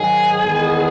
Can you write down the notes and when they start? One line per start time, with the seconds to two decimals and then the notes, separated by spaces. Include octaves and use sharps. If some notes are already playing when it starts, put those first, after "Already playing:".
Already playing: G#2 D#3 F#3 G#4
0.40 E2 D#3 G#3 B3